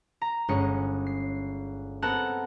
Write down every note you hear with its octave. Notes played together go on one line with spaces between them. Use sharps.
A#5
G1 G#3 C#4 C#7
C7
B3 C4 A4 A#4 F#5 A5